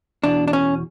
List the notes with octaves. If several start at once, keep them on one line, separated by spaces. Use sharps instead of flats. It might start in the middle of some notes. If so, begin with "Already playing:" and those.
E2 B2 D4
D4
C#4